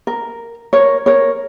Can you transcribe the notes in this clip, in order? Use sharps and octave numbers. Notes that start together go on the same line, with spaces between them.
A#4
A#4 C#5
A#4 C#5